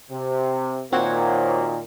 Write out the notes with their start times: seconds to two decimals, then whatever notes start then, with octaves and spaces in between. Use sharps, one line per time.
0.11 C3
0.92 A#2 D#3 A#3 C4 F#4 C#5